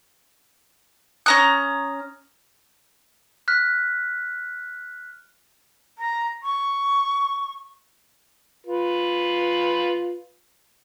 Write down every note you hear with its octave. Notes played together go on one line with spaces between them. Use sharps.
C#4 A#5 D#6 F#6
F6 F#6 B6
A#5
C#6
F4 B4